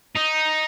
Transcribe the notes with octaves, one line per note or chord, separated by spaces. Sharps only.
D#4